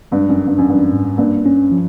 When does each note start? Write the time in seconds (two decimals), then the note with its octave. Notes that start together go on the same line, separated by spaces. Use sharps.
0.12 G2 G#3
0.29 F#2
0.39 C#4
0.47 G2
0.58 F#2
0.65 G2 E3
0.92 G#2
1.18 G2 A#3
1.46 C#4
1.72 F3